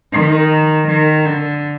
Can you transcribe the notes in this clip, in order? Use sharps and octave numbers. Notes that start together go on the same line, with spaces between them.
D#3
D#3
D3